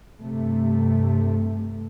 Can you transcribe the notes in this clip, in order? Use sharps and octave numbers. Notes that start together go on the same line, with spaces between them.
G2 C3 A3